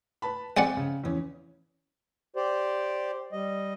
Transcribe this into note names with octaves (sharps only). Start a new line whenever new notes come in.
B4 A5 B5
G#3 C4 D5 F#5 G5
C#3
E2 C#4
G4 C5 D5
G3 D#5